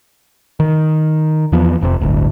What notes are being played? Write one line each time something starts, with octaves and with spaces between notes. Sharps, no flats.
D#3
E2 F3 B3
F1 F2 G#2 C3
D1 G1 D2